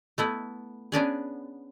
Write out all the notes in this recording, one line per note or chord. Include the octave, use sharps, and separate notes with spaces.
A3 B3 E4
B3 C#4 D4 G#4